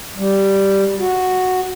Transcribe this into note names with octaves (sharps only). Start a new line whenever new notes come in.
G3
F#4